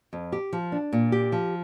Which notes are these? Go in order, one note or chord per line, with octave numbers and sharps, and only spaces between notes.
F2
G4
F3
D4
A#2
G4
F3